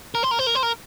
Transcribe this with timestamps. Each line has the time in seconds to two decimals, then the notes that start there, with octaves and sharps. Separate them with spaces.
0.15 A#4
0.23 C5
0.31 A#4
0.39 C5
0.47 A#4
0.55 C5
0.63 A#4